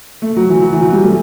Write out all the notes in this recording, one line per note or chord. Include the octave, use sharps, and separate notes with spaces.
A3
F#3
E3
F#3
E3
F#3
G3
A3